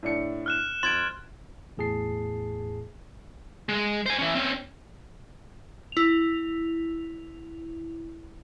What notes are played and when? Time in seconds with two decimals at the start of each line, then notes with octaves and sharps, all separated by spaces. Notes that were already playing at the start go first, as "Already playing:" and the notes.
0.03 A2 D4 C#7
0.46 F6 F#6 E7
0.83 F2 C6 G#6 A6 D7
1.77 E2 A2 G#4 A5 C7
3.69 G#3
4.06 C5 G#5
4.19 E3 C#4
4.35 C4 C#4
5.92 E4 F7